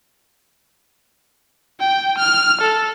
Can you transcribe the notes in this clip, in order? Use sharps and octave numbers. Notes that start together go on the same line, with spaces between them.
G5
F6
A4